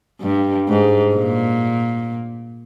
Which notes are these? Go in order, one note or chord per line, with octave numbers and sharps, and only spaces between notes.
G2
G#2
A#2